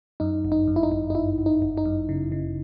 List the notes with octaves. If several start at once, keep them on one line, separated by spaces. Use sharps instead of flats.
F#2 D#4
G1
D#4
F#2
E4
D#4
G1
D#4
G1 E4
G1
D#4
G1
D#4
F#2
C#3
C#3